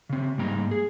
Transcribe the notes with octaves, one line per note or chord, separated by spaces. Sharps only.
C#3 C4
G#2 G3 A#3 G5 A#5
G#4